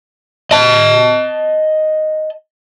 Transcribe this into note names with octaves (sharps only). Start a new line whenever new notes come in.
D#5 A5